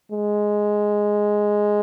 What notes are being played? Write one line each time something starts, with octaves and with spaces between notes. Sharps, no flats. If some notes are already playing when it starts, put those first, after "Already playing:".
G#3